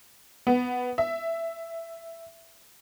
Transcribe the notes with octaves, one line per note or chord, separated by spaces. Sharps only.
B3
E5